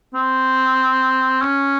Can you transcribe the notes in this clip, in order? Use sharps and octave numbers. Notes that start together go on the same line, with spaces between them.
C4
C#4